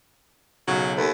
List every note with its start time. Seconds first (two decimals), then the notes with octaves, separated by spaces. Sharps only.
0.68 B1 C#3 F#3
0.98 D#2 A4 B4